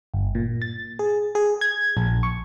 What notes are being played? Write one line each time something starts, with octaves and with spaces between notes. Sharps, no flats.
G1
A#2
A6
G#4
G#4
G#6
A#1
C#6